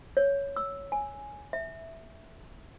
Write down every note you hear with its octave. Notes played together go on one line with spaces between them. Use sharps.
C#5
E6
G#5
E5